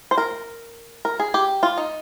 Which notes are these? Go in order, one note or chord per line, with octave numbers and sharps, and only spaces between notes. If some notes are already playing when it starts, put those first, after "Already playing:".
C5
A#4
A#4
G#4
G4
F4
D#4